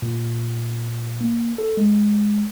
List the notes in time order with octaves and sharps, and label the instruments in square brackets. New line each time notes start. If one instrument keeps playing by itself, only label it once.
[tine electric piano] A#2
A#3
A4
G#3